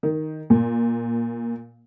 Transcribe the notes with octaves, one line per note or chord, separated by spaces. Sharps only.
D#3
A#2